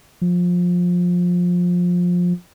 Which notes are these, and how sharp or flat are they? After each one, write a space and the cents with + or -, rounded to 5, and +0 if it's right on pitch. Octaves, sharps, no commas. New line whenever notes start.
F3 +20